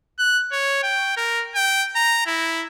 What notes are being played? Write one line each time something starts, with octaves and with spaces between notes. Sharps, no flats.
F#6
C#5
G5
A#4
G5
A#5
E4